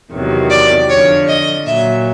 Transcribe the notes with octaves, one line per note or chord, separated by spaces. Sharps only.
E2 C3 D#3 F#3
D5
F2 D3 F3 C#5
D#5
A#2 F#3 E5